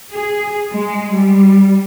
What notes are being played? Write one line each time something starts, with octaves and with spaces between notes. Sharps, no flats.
G#4
G#3
G3